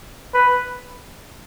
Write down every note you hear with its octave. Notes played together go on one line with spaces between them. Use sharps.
B4